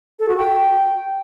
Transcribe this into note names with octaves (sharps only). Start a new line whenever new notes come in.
A4
F#4
G5